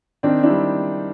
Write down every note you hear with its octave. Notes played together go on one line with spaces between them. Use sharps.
D#3 C4 D4
D4 E4
G3